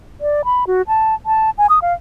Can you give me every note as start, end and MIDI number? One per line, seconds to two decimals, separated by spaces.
0.21 0.42 74
0.45 0.64 83
0.67 0.82 66
0.88 1.15 81
1.26 1.50 81
1.58 1.67 80
1.70 1.79 87
1.82 1.93 77